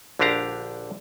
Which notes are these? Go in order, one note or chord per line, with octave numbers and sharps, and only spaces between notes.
A#1 D3 D4 G4 F5 A#5